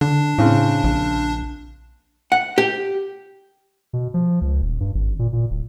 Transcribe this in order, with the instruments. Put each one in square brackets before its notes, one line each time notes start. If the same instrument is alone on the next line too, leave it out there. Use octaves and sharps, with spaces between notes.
[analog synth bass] D3 [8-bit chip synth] D4
[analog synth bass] A2 [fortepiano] C#3 C4
[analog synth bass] A#1
[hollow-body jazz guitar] F#5
G4
[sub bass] B2
F3
C#2
D#1
G2
G#1
A#2
A#2
D1